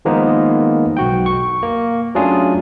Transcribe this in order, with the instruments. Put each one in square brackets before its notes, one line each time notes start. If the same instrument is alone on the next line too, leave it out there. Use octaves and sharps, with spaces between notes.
[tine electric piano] D#3 F3 G#3 A#3 B3 D#4
B1 F#4 G5
C#6
A#3
F#3 A3 C#4 D4 F4 G#4